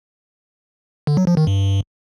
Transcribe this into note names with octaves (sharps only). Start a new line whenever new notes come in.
D3
F#3
F3
D#3
G2